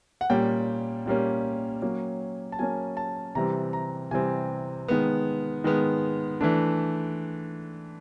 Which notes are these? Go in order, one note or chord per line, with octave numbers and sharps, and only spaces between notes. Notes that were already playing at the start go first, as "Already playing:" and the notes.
F#5
A#2 G3 A#3 C#4 G5
A#2 G3 A#3 C#4
F#3 A#3 C#4
A5
F#3 A#3 C#4 G#5
A5
C3 E3 G3 C4 A#5
A#5
C3 E3 G3 C4 G#5
D#3 G#3 B3
D#3 G#3 B3
E3 A3 D4